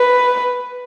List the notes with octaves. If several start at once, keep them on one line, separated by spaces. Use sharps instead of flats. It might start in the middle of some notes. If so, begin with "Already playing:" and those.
Already playing: B4